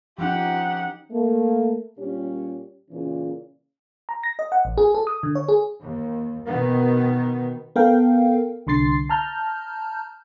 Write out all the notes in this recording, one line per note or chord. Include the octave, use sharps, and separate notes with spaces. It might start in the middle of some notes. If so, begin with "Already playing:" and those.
F3 C#4 D#4 G4 F#5
A3 A#3
A#2 G3 C#4 G4
A#2 C#3 E3 C#4
A#5
A#6
D#5
F#5
A1
G#4
A4
D#6
D3
C#5
G#4
D#2
B2 D#3 B3
B3 A4 A#4 F5 G5
C2 D3 C6 A6 C7
A5 A#5 F6 G6